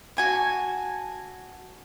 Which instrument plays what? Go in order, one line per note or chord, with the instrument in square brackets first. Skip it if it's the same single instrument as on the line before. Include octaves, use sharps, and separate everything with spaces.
[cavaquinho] F#4 G#5 A5